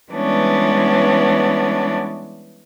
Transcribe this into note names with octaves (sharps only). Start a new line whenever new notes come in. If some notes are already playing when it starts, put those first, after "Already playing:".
E3 G3 G#3 B3 C#4 D4